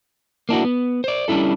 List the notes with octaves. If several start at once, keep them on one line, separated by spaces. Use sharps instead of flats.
A#3 D4 E4 F#4
B3
C5 D5
G3 C#4 D4 E4 A4